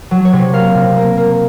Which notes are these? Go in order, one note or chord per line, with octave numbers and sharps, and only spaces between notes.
F#3
C#5
C3
A#3 F5
C3
A#3
A#3